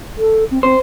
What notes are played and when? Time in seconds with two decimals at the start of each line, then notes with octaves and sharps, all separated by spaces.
0.18 A4
0.51 C4
0.63 C4 C5